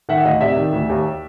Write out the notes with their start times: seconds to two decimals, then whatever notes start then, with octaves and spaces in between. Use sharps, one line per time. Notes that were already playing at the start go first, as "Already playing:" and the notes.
0.09 D#3 E5 F#5
0.25 D2 D#5 F5
0.41 C3 D5 E5
0.57 D#3
0.73 D2
0.89 D#2